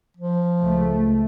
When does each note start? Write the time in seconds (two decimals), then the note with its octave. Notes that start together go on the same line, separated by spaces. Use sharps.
0.17 F3
0.62 C#2 A3